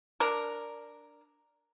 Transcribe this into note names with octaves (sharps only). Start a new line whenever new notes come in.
D4 A#4